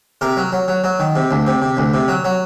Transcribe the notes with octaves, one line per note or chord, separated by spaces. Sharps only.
C3 A#4
F#3
F#3
F#3
F#3
D#3
C3
D2
C3
C3
D2
C3
F#3
F#3